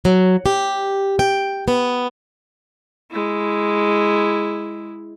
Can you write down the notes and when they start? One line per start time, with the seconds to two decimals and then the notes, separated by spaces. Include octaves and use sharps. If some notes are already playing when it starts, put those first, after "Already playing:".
0.05 F#3
0.46 G4
1.19 G5
1.68 B3
3.11 G#3 E4